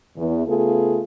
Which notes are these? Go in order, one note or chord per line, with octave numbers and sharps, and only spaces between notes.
E2
C#3 A3 B3 F4 G#4 A4